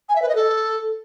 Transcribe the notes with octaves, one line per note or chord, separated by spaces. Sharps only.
G#5
E5
B4
D#5
A4